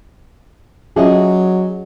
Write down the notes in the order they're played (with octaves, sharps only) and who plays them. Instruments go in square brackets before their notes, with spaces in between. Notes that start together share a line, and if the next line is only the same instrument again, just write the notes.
[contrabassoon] F#3 [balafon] C#4 F4 E5 [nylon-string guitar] G#4 D#5